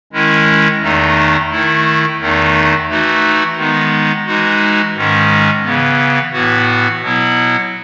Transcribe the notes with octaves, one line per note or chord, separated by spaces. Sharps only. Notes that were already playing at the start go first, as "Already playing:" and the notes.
D#3 G#3 C#4 E4
E2 D#3 A3 D#4
D#3 A3 E4
E2 D#3 A3 D#4
E3 A3 D#4 F#4
D#3 G#3 B3 D#4
E3 G#3 D#4 F#4
G#2 D#3 G#3 C#4
C#3 E3 B3
A2 E3 B3 F#4
B2 F#3 B3 E4